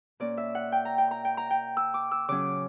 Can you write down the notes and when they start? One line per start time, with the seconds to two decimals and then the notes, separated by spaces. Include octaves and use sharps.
0.20 A#2 A#3 C#4 D5
0.37 E5
0.55 F#5
0.72 G5
0.85 A#5
0.98 G5
1.11 A#5
1.25 G5
1.37 A#5
1.50 G5
1.77 E6
1.94 D6
2.11 E6
2.28 C#3 F#3 C#4 D6